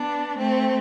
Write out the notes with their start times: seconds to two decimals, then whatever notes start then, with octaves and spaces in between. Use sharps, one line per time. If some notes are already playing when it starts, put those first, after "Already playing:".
Already playing: B3 D4
0.37 A3 C4